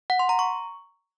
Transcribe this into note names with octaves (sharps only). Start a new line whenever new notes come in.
F#5
C6
A#5
C#6